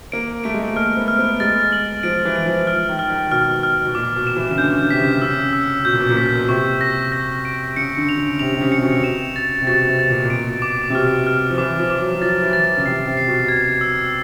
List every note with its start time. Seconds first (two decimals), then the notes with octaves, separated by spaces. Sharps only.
0.12 A#3 D7
0.44 A3 D7
0.54 G#3
0.63 A3
0.76 A#3 F6
0.97 B3
1.08 F6
1.19 B3
1.40 G#3 A6
1.72 F#7
2.03 F3 D7
2.25 E3
2.36 D7
2.46 F3
2.67 F6
2.89 D#3
2.99 F6
3.10 D#3
3.31 B2 F6
3.63 F6
3.86 B2
3.95 A#2 D6
4.16 B2
4.27 E7
4.36 E3
4.51 C#3
4.58 D3 G6
4.80 D3
4.90 C3 B6
5.00 C#3
5.22 C#3 E6
5.53 E6
5.85 B2 G6
5.93 A#2
6.00 B2
6.10 A#2
6.17 B2 B6
6.49 C3 C#6
6.81 A#6
7.12 A#6
7.45 D7
7.76 C#3 C#7
7.97 D3
8.09 F7
8.18 C#3
8.39 C3 F7
8.55 C3
8.61 C#3
8.72 C#7
8.78 C3
8.82 B2
9.04 E7
9.36 A6
9.62 C3
9.67 B2 A6
9.89 C3
9.99 A6
10.10 A#2
10.25 A#2
10.30 B2 D7
10.62 D6
10.90 C3
10.94 B2 F6
11.27 F6
11.50 F3
11.58 E3 D6
11.79 F3
11.90 D6
12.00 F#3
12.15 F#3
12.22 F3 A6
12.43 E3
12.53 A6
12.77 C#3
12.85 C3 C7
13.06 C3
13.17 C7
13.28 B2
13.48 G#6
13.81 E6